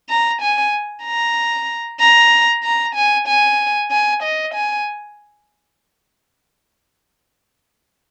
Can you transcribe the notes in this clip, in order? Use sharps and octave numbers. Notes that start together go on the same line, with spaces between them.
A#5
G#5
A#5
A#5
A#5
G#5
G#5
G#5
D#5
G#5